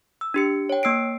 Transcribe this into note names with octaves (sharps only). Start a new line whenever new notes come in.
E6
D4 G4 C#7
C#5 G5
A#3 E6 C7 D7